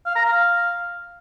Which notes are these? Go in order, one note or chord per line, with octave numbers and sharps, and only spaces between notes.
F5
A#5
F5